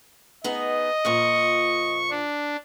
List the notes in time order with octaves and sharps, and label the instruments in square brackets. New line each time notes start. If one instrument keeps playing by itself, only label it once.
[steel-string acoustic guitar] B3 D#4 G#4 [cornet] D#5
[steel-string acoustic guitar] F2 A#2 F3 [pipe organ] C#6
[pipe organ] D4